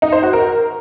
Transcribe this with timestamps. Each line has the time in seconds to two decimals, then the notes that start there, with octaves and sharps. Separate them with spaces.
0.02 D#4
0.12 C5
0.23 F#4
0.33 A#4